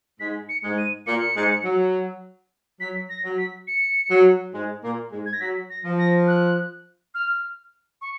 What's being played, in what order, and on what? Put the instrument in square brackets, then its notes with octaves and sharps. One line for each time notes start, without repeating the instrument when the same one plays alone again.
[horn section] G#2 G#3 [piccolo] B6
[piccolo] C#7
[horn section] G#2 G#3
[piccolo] D#7
[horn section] A#2 A#3 [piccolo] C#7
[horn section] G#2 G#3
F#3
[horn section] F#3 [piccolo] B6
[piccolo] A#6
[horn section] F#3
[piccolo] B6
C#7
[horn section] F#3
G#2 G#3
A#2 A#3
G#2 G#3
[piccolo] G#6
A#6
[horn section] F#3 [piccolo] B6
[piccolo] A#6
[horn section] F3
[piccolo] A#6
F#6
F6
C#6